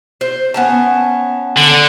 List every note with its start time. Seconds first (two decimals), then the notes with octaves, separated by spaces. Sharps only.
0.21 C5
0.54 B3 C#4 A5
1.57 D3